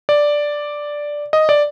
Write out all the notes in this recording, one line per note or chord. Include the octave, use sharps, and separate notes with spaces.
D5
D#5
D5